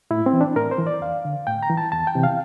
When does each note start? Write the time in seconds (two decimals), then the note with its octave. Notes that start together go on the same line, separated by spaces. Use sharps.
0.11 A2 E4
0.26 C4
0.33 E3
0.41 D4
0.56 A2 A#4
0.71 C5
0.79 E3
0.87 D5
1.01 E2 F5
1.25 D3
1.47 A2 G5
1.63 A#5
1.70 E3
1.77 A5
1.92 E2 A5
2.07 G5
2.15 C3 E3
2.23 F5